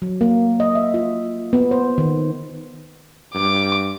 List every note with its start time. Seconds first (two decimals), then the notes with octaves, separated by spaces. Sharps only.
0.02 F#3
0.21 A#3
0.60 D#5
0.75 E5
0.94 F4
1.53 B3
1.71 C5
1.98 D#3
3.34 G2 D6